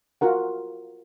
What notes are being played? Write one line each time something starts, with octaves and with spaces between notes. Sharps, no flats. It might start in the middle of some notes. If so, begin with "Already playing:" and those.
F4 F#4 A#4 F#5